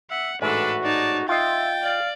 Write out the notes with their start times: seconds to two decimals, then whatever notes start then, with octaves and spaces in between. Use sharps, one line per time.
0.11 E5 F#5
0.42 A1 G#2 D4 F#4 A4 B4 E5
0.84 D#4 D5 A5
1.29 F4 D#5 E5 G5 A6
1.83 D5 F5